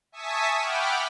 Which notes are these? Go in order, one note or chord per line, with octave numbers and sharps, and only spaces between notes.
E5 G#5 A5 C#6 D#6 B6
F#5 G5 B5 D6 F6